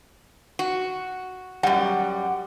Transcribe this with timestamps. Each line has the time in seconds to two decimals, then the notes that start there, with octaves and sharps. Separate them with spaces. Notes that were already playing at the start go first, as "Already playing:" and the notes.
0.59 F#4
1.63 F#2 G3 F#5